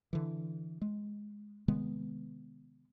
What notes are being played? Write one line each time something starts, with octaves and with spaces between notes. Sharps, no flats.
D3 E3
G#3
C3 D#3 G#3 B3